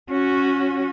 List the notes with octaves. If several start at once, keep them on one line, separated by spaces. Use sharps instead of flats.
C#4 F#4